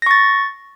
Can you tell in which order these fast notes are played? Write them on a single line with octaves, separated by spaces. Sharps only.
A#6 C#6 A6